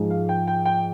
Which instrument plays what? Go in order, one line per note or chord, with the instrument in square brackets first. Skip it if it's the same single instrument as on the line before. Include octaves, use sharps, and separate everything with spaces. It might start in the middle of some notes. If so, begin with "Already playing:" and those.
Already playing: [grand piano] G#2 F3 G#3
F5
G5
G5
G5